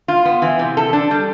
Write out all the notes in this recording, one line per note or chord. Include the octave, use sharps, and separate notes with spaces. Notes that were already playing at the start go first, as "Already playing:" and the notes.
F4
B3
E3
C3
A4
D4
G3